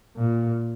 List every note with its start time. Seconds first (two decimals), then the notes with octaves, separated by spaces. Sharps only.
0.16 A#2